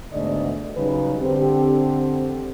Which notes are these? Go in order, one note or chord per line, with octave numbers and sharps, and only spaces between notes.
G#2 B2 D3 A3 D5 D#5
C#3 F#3 G3 D#4 B4
D3 C4 G4